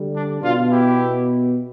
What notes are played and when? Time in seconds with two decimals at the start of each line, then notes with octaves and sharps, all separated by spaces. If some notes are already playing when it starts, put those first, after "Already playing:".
Already playing: D3 G3
0.14 D4
0.42 B2 B3 D4 F4
0.69 E4 G4